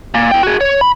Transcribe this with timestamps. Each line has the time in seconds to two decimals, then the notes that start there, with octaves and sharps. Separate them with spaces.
0.14 A#2
0.32 E4 G5
0.43 F#4 G#4
0.61 C#5
0.81 B5